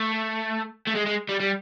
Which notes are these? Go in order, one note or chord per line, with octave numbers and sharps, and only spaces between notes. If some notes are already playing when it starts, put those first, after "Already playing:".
Already playing: A3
A3
G#3
G#3
G3
G3